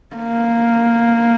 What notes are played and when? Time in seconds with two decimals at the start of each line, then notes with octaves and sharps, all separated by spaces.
0.16 A#3